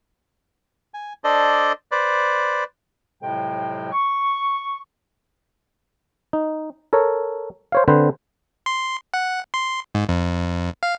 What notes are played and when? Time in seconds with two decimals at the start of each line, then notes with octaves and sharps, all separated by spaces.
0.94 G#5
1.24 D4 A4 C5 D5 D#5
1.92 B4 C5 D5
3.21 F2 A2 C3 F#3 G#3 G5
3.92 C#6
6.33 D#4
6.93 A4 A#4 C#5
7.72 C5 C#5 F5
7.88 D3 C4 B4 C5
8.66 C6
9.14 F#5
9.54 C6
9.95 G#2
10.09 F2
10.83 F5